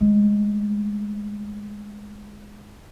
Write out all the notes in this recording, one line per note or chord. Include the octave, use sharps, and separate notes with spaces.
G#3 A3